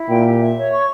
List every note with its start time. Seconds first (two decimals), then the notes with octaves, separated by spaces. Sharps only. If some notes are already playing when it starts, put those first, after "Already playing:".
Already playing: E4
0.09 A#2 G5
0.25 G4
0.41 E5
0.56 C#5
0.72 C#6